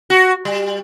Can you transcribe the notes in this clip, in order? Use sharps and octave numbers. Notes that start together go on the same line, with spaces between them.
F#4
G3